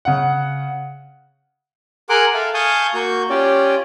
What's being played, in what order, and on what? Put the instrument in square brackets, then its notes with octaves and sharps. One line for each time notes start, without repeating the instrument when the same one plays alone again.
[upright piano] C#3 F#5
[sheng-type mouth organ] G#4 A#4 F#5 C6 D6
A4 E5 F5
F5 G#5 A5 C#6 D#6 G6
A#3 F#4 C#6 G6
C#4 F4 G4 D5